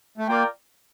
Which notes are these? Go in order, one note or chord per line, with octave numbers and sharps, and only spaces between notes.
A3
A#3 F4 A#4 D5 G5